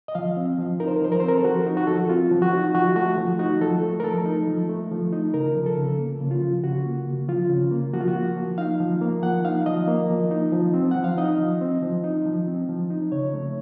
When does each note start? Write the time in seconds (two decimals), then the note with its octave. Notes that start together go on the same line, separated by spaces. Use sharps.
0.08 D#5
0.15 F3 F5
0.37 C4
0.59 F3
0.80 D#4 A#4
0.88 C5
0.96 A#4
1.02 F3 C5
1.12 A#4
1.20 C5
1.23 C4
1.28 A#4
1.38 A4
1.45 F3 F#4
1.66 D#4
1.77 F#4
1.87 F3 A4
1.96 F#4
2.09 C4 F4
2.31 F3
2.42 F#4
2.53 D#4
2.75 F3 F#4
2.96 A3 F#4
3.18 F3
3.39 D#4 F#4
3.61 F3 A4
3.83 A3
4.00 A#4
4.04 F3 A4
4.26 D#4
4.47 F3
4.69 A3
4.91 F3
5.13 D#4
5.34 C#3 A#4
5.55 F3
5.66 A4
5.77 C#3
5.99 A#3
6.20 C#3
6.31 F4
6.41 F3
6.63 C#3 F#4
6.85 A#3
7.07 C#3
7.28 F3 F4
7.50 C#3
7.72 A#3
7.94 F3 F#4
8.01 F4
8.08 F#4
8.15 A#3
8.36 F3
8.58 D#4 F5
8.80 F3
9.02 A#3
9.23 F3 F#5
9.44 D#4 F5
9.66 F3 D#5
9.88 A#3
10.10 F3
10.31 D#4
10.52 F3
10.74 C4
10.91 F3 F#5
11.04 F5
11.18 D#4 D#5
11.39 F3
11.61 C4
11.82 F3
12.04 D#4
12.26 F3
12.48 C4
12.69 F3
12.90 D#4
13.12 C#3 C#5
13.34 A3